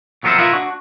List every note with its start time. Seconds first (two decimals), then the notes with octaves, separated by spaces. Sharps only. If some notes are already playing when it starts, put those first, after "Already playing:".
0.23 F2 F#3 B3 A#4 C5 E5
0.39 E4 F4 A#4 B4 D#5 E5
0.53 D4 F#4